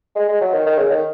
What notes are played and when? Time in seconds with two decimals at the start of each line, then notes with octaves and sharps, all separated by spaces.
0.15 G#3
0.28 G#3
0.41 F#3
0.53 D#3
0.66 D#3
0.78 C#3
0.91 D#3